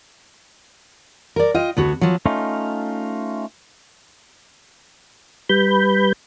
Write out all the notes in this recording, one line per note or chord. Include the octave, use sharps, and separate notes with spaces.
A#4 D5
F4 D#5 G5
D2 B3 F#4
F3 F#3
A3 C#4 D#4 F4
G3 B4 B5 G6